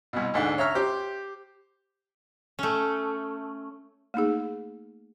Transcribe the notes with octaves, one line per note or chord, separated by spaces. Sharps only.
C2 B2
D2 G#2 D3 F#5
C#5 E5 A#5 E6 F6
G4 C5
A3 C#4
A3 A#3 D#4 G#4